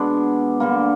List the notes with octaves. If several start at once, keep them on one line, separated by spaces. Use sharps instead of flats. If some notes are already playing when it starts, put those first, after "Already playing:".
Already playing: B2 G#3 B3 D4
D3 G3 A#3